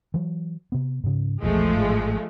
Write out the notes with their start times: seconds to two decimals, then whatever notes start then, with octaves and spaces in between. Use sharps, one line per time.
0.14 E3 F#3
0.72 C3 B3
1.04 G#2 C#3
1.43 E1 A#1 E2 F3 G#3 A3
1.77 G#1 A2